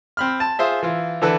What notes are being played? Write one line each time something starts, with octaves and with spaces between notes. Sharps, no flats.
C4 B5 F6
A5
F4 G#4 C5 E5
E3 F4
D3 E3 A4 B4